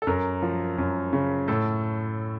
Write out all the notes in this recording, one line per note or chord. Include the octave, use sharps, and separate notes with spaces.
A4
F#2 A#4
F3
F#2
C#3
A2 A4